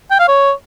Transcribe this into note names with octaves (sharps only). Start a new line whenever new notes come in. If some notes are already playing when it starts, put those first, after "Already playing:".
G5
F5
C#5